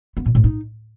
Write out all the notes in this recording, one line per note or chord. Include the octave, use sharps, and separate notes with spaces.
B3
A#2
A2
D#4